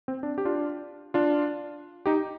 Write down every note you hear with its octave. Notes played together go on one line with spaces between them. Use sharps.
C4
D4
G4
D4 F4
D4 F4
D#4 G4